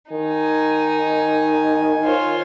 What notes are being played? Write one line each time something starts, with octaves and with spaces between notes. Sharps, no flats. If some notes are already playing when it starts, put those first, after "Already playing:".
D#3 D#4 G#5
F4 C5 C#5